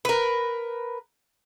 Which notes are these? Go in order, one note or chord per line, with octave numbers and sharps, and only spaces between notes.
A#4 B4